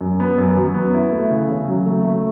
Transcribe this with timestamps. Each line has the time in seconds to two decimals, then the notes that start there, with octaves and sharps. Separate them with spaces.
0.01 F#2
0.20 B3
0.38 F#2
0.57 F#3
0.74 B3
0.94 E4
1.12 A3
1.30 C#3
1.49 C#3
1.68 F#3
1.86 A3
2.04 A3